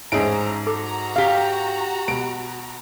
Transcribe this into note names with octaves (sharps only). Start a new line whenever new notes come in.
A1 G#2 C#4 D#4 G#4 C5 A#5 D7
F#4 A4 A#5 D6
G4 F5
B2 D7